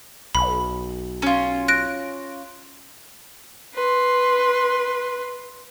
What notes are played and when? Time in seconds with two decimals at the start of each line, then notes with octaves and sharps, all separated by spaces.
0.35 B1 B5
1.22 C#4 F4
1.68 F#6 A#6 D7
3.74 B4 C6